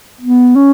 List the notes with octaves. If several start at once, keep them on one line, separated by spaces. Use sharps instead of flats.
B3
C#4